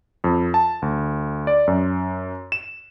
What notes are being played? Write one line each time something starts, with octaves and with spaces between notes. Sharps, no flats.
F2
A5
D2
D5
F#2
E7